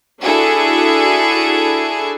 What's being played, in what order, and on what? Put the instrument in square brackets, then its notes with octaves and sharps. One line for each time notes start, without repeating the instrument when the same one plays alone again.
[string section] D4 E4 F#4 G#4 A4